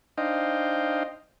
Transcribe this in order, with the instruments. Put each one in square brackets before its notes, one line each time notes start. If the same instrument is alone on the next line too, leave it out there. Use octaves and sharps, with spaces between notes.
[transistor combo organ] D4 D#4 C5 D#5 F5 G5